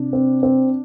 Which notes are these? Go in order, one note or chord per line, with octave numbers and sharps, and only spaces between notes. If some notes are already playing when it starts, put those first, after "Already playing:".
Already playing: C3 D4
C4
C4